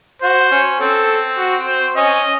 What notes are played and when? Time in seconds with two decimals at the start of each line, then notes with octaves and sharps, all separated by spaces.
0.22 F#4 C5
0.51 C#4
0.80 C4 A4
1.38 F#4
1.68 C5
1.97 C#4 D#5